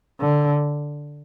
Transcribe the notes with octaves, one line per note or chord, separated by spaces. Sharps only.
D3